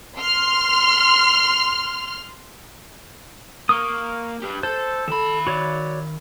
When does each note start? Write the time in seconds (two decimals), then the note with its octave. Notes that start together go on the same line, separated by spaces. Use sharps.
0.20 C6 F6
3.69 A#3 C#6 D#6
4.42 G4 B4
4.63 A4 C5
5.08 D#3 A4 B5
5.47 F#4 C#5 D5